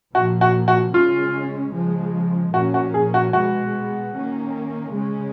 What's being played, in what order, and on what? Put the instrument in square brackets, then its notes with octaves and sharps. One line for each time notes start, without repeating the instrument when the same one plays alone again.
[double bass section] A#2 F3 A#3 [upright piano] F#4
[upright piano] F#4
F#4
[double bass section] C#3 G#3 C#4 [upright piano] F4
[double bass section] C#3 F3 G#3
[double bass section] A#2 F3 A#3 C#4 [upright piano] F#4
[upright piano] F#4
G#4
F#4
[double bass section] B2 G#3 B3 [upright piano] F#4
[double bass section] D#3 A#3 C#4
C#3 G#3 C#4